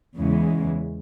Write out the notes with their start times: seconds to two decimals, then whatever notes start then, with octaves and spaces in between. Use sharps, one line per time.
0.18 E2 C#3 E3 G#3